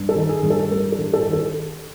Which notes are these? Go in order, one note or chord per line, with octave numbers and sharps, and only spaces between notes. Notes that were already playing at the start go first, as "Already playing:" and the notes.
Already playing: G2
A4
D#3
G#4
G2
A4
G3 A#4
A4
G2
A4
D#3
A4